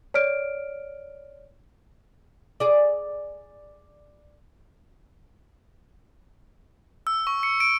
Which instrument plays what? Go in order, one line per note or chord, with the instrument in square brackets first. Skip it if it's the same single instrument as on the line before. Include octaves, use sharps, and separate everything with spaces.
[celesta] C#5 D5 F6 D7
[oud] G#4 D5
[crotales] E6
C#6
C#7
D7